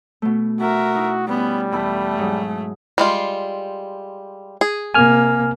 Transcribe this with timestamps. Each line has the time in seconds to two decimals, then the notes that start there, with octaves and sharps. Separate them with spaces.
0.22 B2 A3
0.60 F#4 A#4 E5
0.95 D#4 E4
1.28 G3 B3 C#4
1.73 E2 A3 E4 B5
2.18 G#2 F#3 G#4
2.98 G3 G#3 F4
4.61 G#4
4.94 C3 A#3 G#5 F6